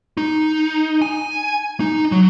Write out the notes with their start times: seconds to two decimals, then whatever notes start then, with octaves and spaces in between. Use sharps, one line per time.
0.17 D#4
1.02 G#5
1.80 D#4
2.12 F#3